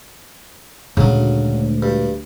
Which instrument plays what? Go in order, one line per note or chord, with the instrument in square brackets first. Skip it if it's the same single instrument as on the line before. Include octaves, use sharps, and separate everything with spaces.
[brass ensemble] D2 [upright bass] A#2 G#3 [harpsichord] C#3 F#3
[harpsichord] G2